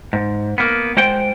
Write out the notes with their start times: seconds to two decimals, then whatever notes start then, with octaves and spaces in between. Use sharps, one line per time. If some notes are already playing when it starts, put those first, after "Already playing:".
0.13 G#2
0.58 A#3 B3
0.97 G#3 F4 C5 F#5 G5